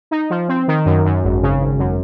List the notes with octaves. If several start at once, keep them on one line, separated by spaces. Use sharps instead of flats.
D#4
F3
C4
D#3
F#2
F#2
G#1
C#3
G#1
F#2